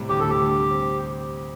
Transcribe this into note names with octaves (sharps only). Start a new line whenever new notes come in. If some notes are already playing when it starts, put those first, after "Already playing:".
Already playing: A2 C3 G3
D2 G4
D2 A4
G4
D3
G3
C4